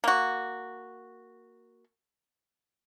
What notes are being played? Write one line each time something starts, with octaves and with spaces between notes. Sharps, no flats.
A#3 F#4